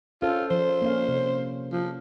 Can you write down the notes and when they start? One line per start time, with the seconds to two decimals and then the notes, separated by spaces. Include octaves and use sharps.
0.22 C#4 F4 A4 C5
0.51 F3 C5
0.82 A#3 C#4 F5
1.08 C3
1.73 F3